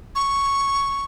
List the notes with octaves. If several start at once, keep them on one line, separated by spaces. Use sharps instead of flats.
C#6